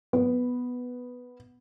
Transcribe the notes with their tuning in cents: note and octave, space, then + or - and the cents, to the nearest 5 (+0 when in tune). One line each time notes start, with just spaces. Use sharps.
B3 +0 B4 +0